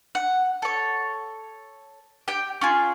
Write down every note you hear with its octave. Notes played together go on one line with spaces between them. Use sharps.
F#5
A4 C#5
G4 G5
C#4 F4 G#4